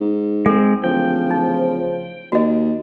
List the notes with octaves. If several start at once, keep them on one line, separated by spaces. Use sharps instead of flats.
G#2
G#3 C4 A4
D1 C#3 F3 G5
D#4
D#2 F#4 D#5